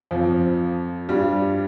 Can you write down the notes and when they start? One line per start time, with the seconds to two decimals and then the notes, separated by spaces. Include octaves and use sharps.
0.11 F2 F3
1.09 G2 G3